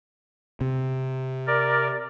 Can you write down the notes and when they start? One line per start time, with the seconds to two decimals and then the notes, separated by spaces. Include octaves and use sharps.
0.61 C3
1.47 A#4 D5